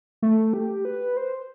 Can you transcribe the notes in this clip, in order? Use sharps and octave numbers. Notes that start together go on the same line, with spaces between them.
A3
G4
B4
C5